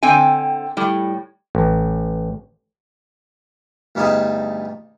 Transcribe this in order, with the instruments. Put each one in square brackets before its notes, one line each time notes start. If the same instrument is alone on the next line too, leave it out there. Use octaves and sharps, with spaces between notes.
[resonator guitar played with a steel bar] D3 C4 G5 G#5
A2 G3
[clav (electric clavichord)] A1
[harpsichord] D2 G2 B3 D#4 G#4 A5